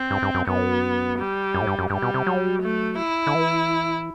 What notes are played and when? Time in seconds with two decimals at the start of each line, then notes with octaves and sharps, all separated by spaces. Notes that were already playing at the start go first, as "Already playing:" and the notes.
Already playing: C4
0.10 G2
0.22 G2
0.34 F#2
0.47 F#2 B3
1.18 G3
1.54 F#2
1.61 A2
1.67 G2
1.79 F#2
1.90 G2 G3
2.02 B2
2.14 C3
2.27 F#3
2.62 A3
2.98 E4
3.27 D3
3.35 E3